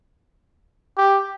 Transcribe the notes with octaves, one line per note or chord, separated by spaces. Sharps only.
G4